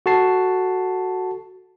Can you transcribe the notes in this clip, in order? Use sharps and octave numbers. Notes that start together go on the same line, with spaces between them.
F#4 A4 A5 C7